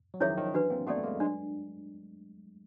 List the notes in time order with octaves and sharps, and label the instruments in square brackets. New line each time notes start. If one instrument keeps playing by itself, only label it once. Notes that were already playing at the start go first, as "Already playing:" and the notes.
[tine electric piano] F#3
[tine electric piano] D#3 F3 [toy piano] C#4 E4 G#4 C#5 E5
[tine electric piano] D#3 F3
[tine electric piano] E3 F#3 [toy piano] D4 F#4 B4
[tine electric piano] A#3 C4
[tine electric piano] A3 B3 [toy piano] F#4 A4 D5
[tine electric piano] G#3 A#3
[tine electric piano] F#3 G#3 [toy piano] D4